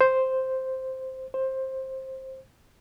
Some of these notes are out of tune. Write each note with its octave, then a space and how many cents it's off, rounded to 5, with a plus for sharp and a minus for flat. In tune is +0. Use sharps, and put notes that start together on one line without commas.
C5 +0
C5 +15